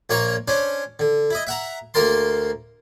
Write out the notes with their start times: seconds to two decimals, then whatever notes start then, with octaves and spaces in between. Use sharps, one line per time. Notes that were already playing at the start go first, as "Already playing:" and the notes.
0.10 A#1 A#3 C#5 A#5 C#6
0.48 C#4 D4 C5
0.99 D3
1.31 E4 D#5
1.47 E5 F#5 A#5
1.94 D2 A#3 A#4 A5 C6